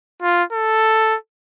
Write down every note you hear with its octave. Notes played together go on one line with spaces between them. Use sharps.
F4
A4